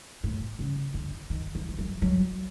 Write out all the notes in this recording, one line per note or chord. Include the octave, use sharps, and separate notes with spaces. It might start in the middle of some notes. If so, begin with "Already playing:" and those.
A2
C#3
D3
D#3
E3
F3
F#3
F#3